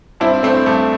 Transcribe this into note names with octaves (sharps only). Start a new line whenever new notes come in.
G2 C4 E4
G2 A3 C4
G2 A3